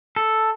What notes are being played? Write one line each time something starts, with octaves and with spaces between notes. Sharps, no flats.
A4